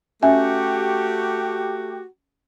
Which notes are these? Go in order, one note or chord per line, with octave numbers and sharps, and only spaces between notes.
A3 C#4 F#4 G4 E5 G#5